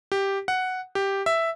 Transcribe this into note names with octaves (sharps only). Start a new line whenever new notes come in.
G4
F#5
G4
E5